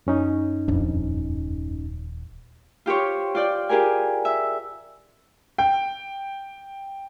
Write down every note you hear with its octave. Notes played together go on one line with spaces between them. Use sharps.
F#2 C#4 D#4
D#1 F2 D4
F4 G4 C5 C#5
F4 D5 G5
F4 G4 G#4 A#4 G#5
E5
G5